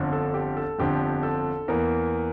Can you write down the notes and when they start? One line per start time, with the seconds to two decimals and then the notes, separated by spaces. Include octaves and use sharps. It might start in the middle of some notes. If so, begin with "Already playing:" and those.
Already playing: G1 F2 D3
0.13 A4
0.34 G4
0.57 A4
0.78 G1 F2 D3 G4
1.23 A4
1.68 E2 E3 A#3 A#4